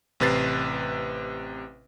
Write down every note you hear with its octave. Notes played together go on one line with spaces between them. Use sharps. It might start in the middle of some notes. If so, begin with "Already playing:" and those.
A1 C3 B4 A6 C7